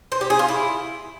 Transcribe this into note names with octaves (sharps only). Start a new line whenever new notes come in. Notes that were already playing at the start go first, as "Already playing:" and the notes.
C5
G4
G#4
F4
E4